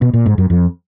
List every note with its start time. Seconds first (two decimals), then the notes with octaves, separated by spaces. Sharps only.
0.01 B2
0.13 A#2
0.26 G#2
0.38 F#2
0.50 F2